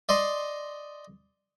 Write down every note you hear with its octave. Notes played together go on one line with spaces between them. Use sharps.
D5 D#5 C6